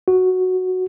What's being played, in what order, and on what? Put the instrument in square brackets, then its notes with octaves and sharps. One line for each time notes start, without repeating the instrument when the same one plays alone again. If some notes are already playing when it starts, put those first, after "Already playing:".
[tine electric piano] F#4